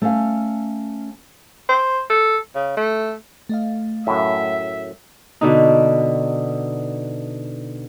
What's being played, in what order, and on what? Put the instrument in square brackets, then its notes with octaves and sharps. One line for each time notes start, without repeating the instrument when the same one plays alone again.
[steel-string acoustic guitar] A3 C#4 F5
[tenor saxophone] C5
A4
C#3
A3
[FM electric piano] A3 D#5 F5
[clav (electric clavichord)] F#2 A2 [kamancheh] E5
[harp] B2 D3 D#4